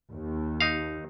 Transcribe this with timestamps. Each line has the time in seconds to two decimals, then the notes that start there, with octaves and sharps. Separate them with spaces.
0.12 D#2
0.61 D#4 F5